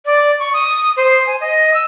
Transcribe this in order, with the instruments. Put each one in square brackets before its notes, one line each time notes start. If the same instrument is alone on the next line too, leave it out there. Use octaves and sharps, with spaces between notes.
[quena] D5
C#6
D#6
C5
G#5
D#5
E6